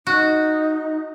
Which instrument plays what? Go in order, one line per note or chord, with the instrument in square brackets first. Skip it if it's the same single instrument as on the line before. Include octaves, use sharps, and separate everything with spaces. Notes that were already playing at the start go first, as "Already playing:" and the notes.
[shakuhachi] D#4 [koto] F#4